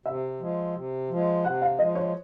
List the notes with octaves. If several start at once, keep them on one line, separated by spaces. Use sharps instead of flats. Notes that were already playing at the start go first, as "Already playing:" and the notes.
C3 E5
F3 G#3
C3
F3 G#3
C3 F#5
F5
F3 G#3 D#5
C#5